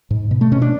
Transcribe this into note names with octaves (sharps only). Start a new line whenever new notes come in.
G#2
B2
A3
B2 C#4
D4